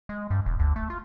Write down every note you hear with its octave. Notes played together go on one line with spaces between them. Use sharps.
G#3
G2
E1
D2
A3
F4